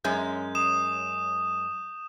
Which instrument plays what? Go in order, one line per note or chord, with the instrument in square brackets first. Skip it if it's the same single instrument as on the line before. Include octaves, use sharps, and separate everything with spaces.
[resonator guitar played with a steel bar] F#2 G#3 C#4 [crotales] G6
[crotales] D#6 E7